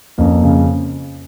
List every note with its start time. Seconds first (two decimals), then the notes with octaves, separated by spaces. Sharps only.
0.18 F2 A#3 C#4
0.43 C#3